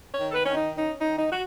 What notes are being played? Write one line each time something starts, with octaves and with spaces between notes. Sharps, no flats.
C#5
D#3
A4
B4
D#3 C#4
D#4
C#4 D#4
D#4
D#3
D#4
F#4